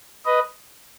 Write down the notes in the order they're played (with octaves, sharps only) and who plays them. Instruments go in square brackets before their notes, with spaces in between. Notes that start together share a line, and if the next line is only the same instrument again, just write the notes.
[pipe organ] B4 D#5